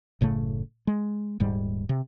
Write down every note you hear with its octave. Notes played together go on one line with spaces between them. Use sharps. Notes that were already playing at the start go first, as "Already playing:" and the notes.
F#1 A2 C#3 A3
G#3
D#1 G#2 G3
C3